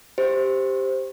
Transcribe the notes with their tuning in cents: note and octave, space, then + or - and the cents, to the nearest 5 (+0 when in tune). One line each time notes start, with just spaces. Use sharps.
G4 +0 C5 +0